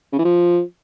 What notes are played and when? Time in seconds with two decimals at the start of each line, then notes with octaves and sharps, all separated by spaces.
0.12 C#3
0.18 E3
0.25 F3